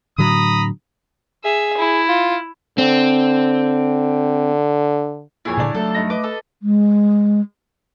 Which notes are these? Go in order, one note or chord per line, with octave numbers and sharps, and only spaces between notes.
A2 D3 F#3 A#5 B5 D#6
G#4 E5
E4
F4
D3 C4
F2 A#2 E4 G#4 C#5
C#2 A#2 D3 D4 D5
F#3 A3 A4
G2 D#4 A#6
B4 D#5 D6
A4
G#3